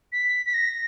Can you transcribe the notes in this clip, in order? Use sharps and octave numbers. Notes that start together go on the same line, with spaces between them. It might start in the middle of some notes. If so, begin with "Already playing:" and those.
B6
B6
A#6